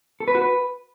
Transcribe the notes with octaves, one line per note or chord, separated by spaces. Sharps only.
A4
B4
F#4
B4